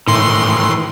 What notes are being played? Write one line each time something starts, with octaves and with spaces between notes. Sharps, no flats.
A2 D#3 E3 C6